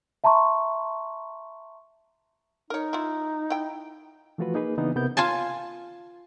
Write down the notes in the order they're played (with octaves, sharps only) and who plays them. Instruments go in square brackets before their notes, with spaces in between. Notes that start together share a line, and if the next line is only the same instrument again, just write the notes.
[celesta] E5 A5 A#5 C6 C#6
[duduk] D#4 [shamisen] A#4 C#5
[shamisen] E4 F4
E4 G5
[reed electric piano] E3 F3 A3 F4 F#4 B4
A#3 D#4 G#4 B4
C#3 E3 B3 D4 D#4
C3 B3 A#4 G6
[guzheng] F4 G#5 A5